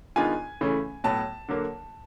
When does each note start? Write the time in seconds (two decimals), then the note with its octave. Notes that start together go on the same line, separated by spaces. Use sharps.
0.16 D#3 G#3 B3 D4 F4 G#5
0.61 C#3 E3 A3 C#4
1.04 A2 F#3 B3 A5
1.48 D3 F#3 A#3